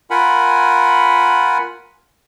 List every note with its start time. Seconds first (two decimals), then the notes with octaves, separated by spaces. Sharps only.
0.10 F4 A#4 F#5 G#5 B5